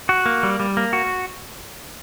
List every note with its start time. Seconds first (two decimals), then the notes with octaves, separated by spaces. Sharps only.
0.09 F#4
0.26 A#3
0.43 G3
0.60 G3
0.77 A#3
0.93 F#4